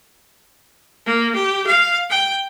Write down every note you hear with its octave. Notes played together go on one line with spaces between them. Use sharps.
A#3
G4
F5
G5